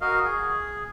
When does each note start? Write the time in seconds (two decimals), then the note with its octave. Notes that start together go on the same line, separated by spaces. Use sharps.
0.01 F#4 A#4 D#5 F5
0.25 G#4